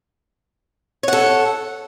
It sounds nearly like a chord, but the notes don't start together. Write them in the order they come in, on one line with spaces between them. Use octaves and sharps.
C#5 F#5 A4